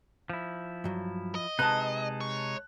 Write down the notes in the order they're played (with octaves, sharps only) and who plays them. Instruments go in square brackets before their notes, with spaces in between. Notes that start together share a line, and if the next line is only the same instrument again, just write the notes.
[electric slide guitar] F3 E4
[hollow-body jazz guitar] G2 F#3
[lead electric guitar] D#5
[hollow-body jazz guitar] C3 B4 [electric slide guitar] G#3 D#4 [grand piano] A5 F#6
[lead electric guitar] C#5